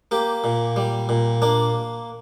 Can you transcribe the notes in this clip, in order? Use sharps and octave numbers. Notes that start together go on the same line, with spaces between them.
A#3 G4
A#2
G3
A#2
A#3 D4